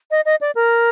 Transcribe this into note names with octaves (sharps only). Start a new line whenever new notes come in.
D#5
D#5
D5
A#4